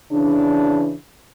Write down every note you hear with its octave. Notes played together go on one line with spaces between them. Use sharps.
C#3 E3 D4